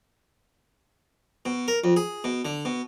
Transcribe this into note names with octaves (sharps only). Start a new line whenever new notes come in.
B2
A#4
F2
G#4
B2
D3
B2